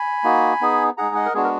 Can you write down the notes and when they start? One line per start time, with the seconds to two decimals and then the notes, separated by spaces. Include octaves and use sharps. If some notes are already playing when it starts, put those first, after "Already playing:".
Already playing: G#5 B5
0.24 A#3 D#4 F#4
0.61 B3 D#4 G#4
0.97 G#3 D#4 G#4 F#5 A#5
1.15 D#5 F#5
1.26 A#4
1.34 G#3 B3 D4 F#4 G#4
1.44 A#4